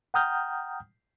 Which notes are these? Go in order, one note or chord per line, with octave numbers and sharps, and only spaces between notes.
F#5 G5 A#5 D#6 F6 G6